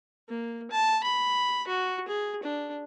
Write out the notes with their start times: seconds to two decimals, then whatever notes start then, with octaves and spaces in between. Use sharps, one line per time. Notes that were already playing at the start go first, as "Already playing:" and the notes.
0.29 A#3
0.71 A5
1.03 B5
1.67 F#4
2.08 G#4
2.43 D4